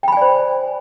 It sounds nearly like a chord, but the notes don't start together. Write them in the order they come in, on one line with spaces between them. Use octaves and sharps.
G5 B5 G#5 D5 C5